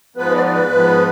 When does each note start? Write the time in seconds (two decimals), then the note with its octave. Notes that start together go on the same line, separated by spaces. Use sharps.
0.16 G#2 F3 B3 B4
0.35 D5
0.47 D5
0.52 B4
0.71 G#2 F3 B3